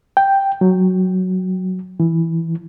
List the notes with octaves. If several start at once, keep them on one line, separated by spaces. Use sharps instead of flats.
G5
F#3
E3